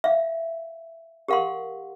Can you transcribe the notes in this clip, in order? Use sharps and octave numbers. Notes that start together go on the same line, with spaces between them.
E5 F5
G4 A#4 F5 F#5 C6